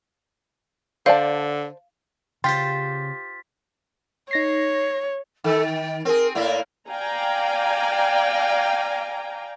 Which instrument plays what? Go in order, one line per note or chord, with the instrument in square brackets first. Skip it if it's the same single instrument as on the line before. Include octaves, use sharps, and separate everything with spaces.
[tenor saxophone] D3 [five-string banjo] C5 D5 A5 [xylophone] F5
[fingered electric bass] C#3 [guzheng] F4 G4 C5 [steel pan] G5 C6 [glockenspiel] A6 B6
[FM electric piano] D#4 A#6 C7 [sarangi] C#5
[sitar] D#3 [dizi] A4
[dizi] G5
[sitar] C4 G#4 [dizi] A#4
[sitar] A2 A#3 E4 [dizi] D5
[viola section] D5 F5 G5 G#5 A#5